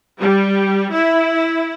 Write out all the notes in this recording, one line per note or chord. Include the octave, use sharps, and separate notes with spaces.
G3
E4